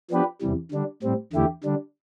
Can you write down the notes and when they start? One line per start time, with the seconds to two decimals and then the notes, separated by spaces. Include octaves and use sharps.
0.10 F3 B3 D4 G4 B4
0.41 E2 C3 E3 G3
0.72 D3 G3 D4
1.03 A2 G3 C4
1.33 E2 D3 A3 E4 G4
1.64 D3 G3 D4